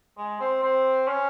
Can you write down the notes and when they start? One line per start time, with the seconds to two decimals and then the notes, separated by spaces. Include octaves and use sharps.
0.17 G#3
0.40 C4
0.63 C4
1.08 C#4